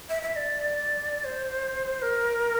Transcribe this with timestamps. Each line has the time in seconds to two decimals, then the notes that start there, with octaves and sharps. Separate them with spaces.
0.10 E5
0.22 E5
0.36 D5
1.25 C5
2.02 A#4